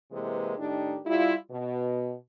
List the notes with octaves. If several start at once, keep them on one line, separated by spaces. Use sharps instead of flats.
C3 E3 G#3 A#3 B4
A2 D#3 D4 D#4 G4
G3 E4 F4
B2